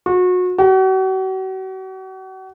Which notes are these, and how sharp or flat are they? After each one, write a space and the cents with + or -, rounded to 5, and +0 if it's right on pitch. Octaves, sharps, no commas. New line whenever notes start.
F#4 -30
F#4 +40